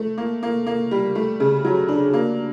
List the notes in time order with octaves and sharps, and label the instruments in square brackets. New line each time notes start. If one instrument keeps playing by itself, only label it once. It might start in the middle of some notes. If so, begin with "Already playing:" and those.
Already playing: [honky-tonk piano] A3
A#3
A#3
A#3
G3
A3
C#3
F#3
D4
A#3